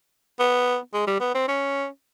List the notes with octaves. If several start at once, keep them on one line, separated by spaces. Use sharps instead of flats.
B3
G#3
G3
B3
C4
C#4